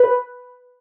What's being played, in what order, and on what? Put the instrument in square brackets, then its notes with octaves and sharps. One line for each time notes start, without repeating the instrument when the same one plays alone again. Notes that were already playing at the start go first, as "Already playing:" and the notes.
Already playing: [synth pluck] B4